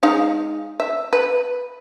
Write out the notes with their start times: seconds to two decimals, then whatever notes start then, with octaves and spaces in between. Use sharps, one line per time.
0.03 G#3 D#4 F5
0.80 E5
1.13 B4